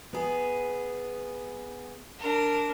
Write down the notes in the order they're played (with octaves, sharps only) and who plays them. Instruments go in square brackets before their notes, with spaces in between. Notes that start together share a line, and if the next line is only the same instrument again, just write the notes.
[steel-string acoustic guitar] B3 G#4
[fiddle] D4 A#4